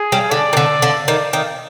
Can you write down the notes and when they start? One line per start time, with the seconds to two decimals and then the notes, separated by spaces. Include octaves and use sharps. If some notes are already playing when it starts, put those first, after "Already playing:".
Already playing: G#4
0.12 G3
0.31 D3 D5
0.53 D#3
0.57 D3
0.82 D3
1.08 D#3 D5
1.33 D#3